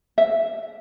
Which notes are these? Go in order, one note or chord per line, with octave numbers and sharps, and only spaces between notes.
E5